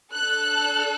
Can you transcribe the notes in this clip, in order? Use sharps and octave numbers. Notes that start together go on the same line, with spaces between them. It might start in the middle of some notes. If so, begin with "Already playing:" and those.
D4 A4 F#6